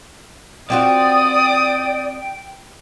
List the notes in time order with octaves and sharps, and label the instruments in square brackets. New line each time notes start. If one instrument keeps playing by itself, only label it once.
[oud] C4 F4 F#4 [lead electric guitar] D5 [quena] G5 [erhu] D#6